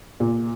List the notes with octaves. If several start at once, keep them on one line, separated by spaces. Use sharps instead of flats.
A#2